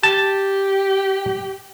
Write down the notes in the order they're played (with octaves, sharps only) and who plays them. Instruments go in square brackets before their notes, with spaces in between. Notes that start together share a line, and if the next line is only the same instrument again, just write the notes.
[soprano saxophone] G4 [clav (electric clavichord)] A5